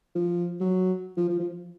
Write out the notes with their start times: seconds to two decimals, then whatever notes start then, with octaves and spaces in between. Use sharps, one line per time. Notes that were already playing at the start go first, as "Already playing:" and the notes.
0.15 F3
0.60 F#3
1.17 F3
1.29 F3
1.39 F3